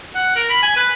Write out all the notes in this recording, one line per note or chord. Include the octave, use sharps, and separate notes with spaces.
F#5
A#4
B5
G#5
B4